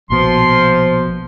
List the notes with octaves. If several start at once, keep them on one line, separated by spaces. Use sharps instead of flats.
A#1 B2 F3 C6